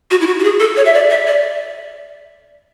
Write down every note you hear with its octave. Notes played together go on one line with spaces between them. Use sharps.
F#4
E4
F#4
F#4
G#4
A4
C#5
E5
D5
E5
D5